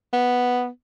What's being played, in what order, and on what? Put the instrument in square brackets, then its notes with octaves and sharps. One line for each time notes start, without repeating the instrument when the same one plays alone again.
[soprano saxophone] B3